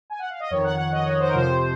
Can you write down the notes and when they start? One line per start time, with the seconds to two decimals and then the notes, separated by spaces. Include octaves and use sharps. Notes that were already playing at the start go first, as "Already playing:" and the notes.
0.10 G#5
0.19 F#5
0.30 F5
0.40 D#5
0.50 F2 D#3 C#5
0.64 F#5
0.77 F#5
0.92 D#5
1.05 C#5
1.19 C5
1.28 A#4
1.34 F2 C3 F3 C5